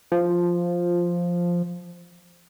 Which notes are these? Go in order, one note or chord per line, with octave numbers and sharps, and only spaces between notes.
F3